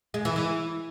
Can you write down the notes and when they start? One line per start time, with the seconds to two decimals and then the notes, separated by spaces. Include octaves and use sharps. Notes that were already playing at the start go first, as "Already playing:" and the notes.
0.14 G#3
0.25 E3
0.36 E3